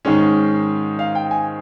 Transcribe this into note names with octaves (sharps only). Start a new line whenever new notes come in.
G#2 D#3 G#3 C#4
F5
G5
G#5